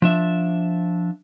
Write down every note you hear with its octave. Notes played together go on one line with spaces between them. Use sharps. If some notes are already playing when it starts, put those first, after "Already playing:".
F3 D4 E5